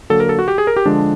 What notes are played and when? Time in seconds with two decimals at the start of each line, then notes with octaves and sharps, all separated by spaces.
0.10 D3 F#3 A#3 A4
0.20 A#4
0.29 A4
0.39 F#4
0.48 G4
0.58 G#4
0.67 A#4
0.76 G4
0.85 D3 F3 G#3 D4